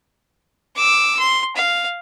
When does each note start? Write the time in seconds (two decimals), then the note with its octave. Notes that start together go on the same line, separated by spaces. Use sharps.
0.76 D6 E6
1.19 C6
1.56 F5